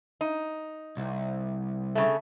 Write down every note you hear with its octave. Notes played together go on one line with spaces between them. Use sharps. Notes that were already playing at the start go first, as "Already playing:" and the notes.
D#4
C2
C#3 A3